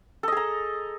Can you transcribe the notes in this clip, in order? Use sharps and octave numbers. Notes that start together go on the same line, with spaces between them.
G#4 A4 D#5 A#5